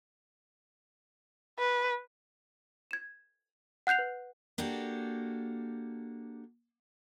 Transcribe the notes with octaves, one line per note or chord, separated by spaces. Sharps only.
B4
G#6 E7
F#5 F#6 G6 C7 F7
B4
A#3 D4 F#4 G4 A4